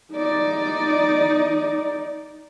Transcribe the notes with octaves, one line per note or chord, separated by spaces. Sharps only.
D#4 D5